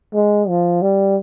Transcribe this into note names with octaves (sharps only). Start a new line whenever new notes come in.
G#3
F3
G3